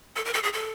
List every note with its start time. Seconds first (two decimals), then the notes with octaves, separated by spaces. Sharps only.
0.16 A4
0.25 A#4
0.34 A4
0.43 G#4
0.53 A4